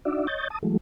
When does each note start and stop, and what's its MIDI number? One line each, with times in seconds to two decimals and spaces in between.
0.05 0.27 62
0.05 0.27 63
0.05 0.27 66
0.05 0.27 74
0.05 0.27 76
0.27 0.48 73
0.27 0.48 75
0.27 0.48 91
0.27 0.48 93
0.50 0.59 81
0.50 0.59 87
0.63 0.77 52
0.63 0.77 54
0.63 0.77 56
0.63 0.77 57